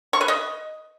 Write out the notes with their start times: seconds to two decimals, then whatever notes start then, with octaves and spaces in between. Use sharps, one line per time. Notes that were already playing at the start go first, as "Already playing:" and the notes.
0.13 C#6
0.21 B4
0.28 D#5